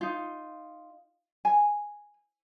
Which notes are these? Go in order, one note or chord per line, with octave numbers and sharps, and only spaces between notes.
D#4 F4
G#5